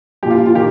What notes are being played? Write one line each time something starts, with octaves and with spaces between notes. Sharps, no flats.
A#2 F3 G4
F4
F4
D#3 G4